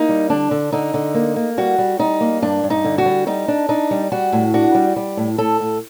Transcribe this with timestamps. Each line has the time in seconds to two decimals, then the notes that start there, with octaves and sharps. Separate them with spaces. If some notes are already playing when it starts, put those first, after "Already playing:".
Already playing: A#3 D#4
0.09 G3
0.30 D3 D4
0.51 D3
0.72 D3 D#4
0.94 D3
1.14 A#3
1.36 A#3
1.58 G3 F#4
1.78 G3
1.99 G3 D#4
2.21 A#3
2.42 G2 D4
2.63 G2
2.70 D#4
2.84 D3
2.98 F#4
3.06 G3
3.27 G3 D#4
3.48 D4
3.69 D4 D#4
3.91 G3
4.12 G3 F#4
4.32 A2
4.54 D4 F#4
4.75 G3
4.96 G3
5.17 A2
5.38 A2 A4
5.60 A2